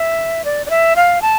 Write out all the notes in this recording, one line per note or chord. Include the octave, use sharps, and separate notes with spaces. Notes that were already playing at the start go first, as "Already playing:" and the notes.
Already playing: E5
D5
D5
E5
F5
A5